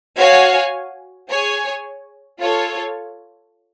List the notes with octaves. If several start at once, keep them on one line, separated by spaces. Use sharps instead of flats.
F#4 C#5 F5 G#5
G#4 C#5 G#5
F4 A4 C#5